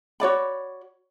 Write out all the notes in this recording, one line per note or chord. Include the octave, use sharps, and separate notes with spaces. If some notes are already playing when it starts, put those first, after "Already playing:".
F#4 C#5 D5 B5